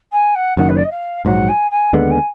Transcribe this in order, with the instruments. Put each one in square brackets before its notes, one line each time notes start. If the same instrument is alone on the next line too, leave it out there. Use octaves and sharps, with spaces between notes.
[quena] G#5
F#5
[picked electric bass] F#1 F#2 D#3 [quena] F#5
[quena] B4
D5
D#5
F5
[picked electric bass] A#1 G#2 F#3 [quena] F#5
[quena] G#5
G#5
[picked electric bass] D#2 D3 G#3 B3 [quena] F#5
[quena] G#5